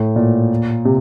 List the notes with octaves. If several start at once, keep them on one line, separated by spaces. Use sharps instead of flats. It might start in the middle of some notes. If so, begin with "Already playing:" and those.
Already playing: A2
A#2
C3